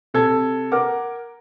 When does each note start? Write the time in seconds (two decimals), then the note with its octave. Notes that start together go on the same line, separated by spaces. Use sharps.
0.14 C3 A4 G#6
0.72 A#4 F#5 D6